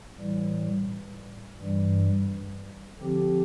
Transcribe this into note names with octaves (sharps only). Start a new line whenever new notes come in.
A2 E3 G3
G2 E3 G3
D3 F3 C4 G4